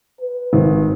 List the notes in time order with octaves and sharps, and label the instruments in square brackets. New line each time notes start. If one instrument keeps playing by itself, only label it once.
[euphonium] B4
[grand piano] G#1